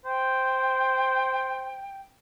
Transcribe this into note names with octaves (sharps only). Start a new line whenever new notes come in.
C5 G5